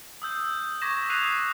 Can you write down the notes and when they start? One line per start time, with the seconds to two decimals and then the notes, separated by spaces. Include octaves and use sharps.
0.22 D#6 E6 G6
0.81 C#6 D6 G#6 A#6 B6 E7
1.09 D#6 F#6 C7 D#7 F7